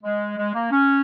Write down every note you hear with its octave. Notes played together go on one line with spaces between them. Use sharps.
G#3
G#3
A#3
C#4